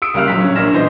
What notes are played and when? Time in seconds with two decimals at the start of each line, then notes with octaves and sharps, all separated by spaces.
0.02 D#6 E6 D7
0.14 C#2 G3 A#3 F5 F6 F#6
0.28 A#1 F#3 B6
0.41 C#4
0.55 A#1 A#3 D4 F6 A#6 E7
0.73 E3 B3 C5 D#5 A#6